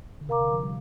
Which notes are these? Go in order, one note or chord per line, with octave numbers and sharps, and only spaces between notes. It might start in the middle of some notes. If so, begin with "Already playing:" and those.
D3
C3 A#4 F5 A#5 D6
D3
F3
G3